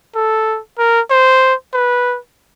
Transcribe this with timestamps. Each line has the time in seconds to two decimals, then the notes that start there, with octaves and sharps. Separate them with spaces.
0.15 A4
0.78 A#4
1.10 C5
1.74 B4